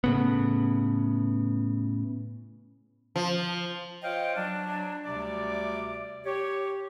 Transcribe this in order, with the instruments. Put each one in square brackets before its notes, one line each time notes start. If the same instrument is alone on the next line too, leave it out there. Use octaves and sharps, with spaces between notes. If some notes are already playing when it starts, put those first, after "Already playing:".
[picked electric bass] A2 C#3 B3
[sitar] F3
[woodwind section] F4 C5 C#5 D#5 F5 G5
F#3 D4
D2 C3 G3 D5 D6
G4 C#5